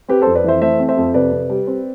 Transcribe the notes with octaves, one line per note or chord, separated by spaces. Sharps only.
C4 G4 B4
F2 A4 C5
B4 D5
E3 C5 E5
A3 C5 E5
C4
C5 E5
F2
C3 B4 D5
C3
G3
C4